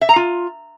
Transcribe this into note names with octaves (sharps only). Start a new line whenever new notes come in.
E5
A#5
F4